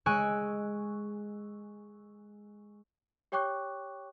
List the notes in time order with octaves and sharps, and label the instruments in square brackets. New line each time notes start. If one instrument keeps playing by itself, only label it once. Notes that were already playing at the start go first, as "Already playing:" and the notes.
[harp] G#3 G#5 C#6 E6 F#6 D7
[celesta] G4 C#5 G5 C#6 D6 F#6